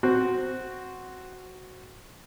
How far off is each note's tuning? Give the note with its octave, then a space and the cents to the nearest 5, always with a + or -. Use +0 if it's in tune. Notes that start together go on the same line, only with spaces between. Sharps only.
C4 +0 F#4 +0